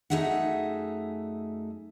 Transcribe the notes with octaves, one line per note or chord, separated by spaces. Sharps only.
F#2 A3 D#4 G#4 E5 F#5